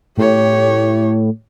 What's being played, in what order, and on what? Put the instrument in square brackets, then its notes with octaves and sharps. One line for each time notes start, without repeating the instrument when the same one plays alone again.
[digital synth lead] A2 [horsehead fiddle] G4 C#5